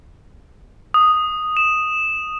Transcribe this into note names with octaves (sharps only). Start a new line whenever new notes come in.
D#6
E7